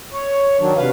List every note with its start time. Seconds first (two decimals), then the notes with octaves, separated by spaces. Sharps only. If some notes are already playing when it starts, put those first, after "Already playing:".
0.13 C#5
0.60 D#3 F#3 D4
0.77 C3 B4 F5